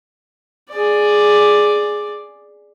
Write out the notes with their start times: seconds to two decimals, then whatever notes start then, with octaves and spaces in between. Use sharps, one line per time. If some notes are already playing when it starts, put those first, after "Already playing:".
0.71 G#4 D5